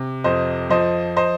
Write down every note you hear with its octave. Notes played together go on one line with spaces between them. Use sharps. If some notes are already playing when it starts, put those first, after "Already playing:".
Already playing: C3
F2 C5 D#5
F3 C5 D#5
C5 D#5